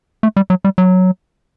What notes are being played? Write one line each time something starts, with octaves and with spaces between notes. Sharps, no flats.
A3
G3
F#3
G3
F#3